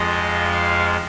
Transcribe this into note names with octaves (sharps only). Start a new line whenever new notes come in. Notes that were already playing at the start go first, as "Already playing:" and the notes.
Already playing: F2 F3 G#3 D#5
F5